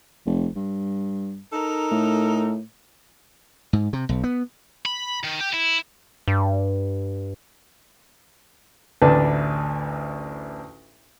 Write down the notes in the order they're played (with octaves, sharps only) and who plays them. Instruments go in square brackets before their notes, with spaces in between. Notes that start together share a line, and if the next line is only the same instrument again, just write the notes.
[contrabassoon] F1
G2
[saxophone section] D#4 A4 A#4
[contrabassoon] A2
[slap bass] G#2
C3
B1
B3
[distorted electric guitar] B5
D#3
G4
E4
[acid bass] G2
[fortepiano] A1 D2 D4 B4 A5